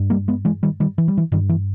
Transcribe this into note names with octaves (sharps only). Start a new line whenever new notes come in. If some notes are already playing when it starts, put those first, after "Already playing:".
Already playing: G2
G3 A#3
G#3 B3
E3 G#3
D#3 G3
D#3 G3
E3
G3
E3
G2 D#3 G3
E3